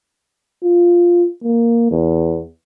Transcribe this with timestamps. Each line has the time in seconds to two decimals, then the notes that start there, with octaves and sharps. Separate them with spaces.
0.63 F4
1.44 A#3
1.91 E2